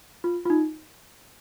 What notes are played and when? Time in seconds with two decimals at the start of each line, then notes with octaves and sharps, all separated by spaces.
0.24 F4
0.46 F4
0.50 D#4